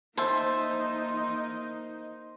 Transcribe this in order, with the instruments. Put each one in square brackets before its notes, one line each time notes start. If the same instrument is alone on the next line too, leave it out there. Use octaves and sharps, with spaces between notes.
[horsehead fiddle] A#3 D#4 [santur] C5 [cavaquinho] E5 A5